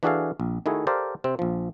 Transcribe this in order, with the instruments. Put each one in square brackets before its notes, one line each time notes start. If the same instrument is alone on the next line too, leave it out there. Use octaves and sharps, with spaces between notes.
[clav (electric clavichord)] E3 D4 F#4 G#4 A4 F5
A#1
D#3 A3 E4 F#4 G#4
G4 A4 A#4 C5 D5 F5
C3 C4
A#1 F3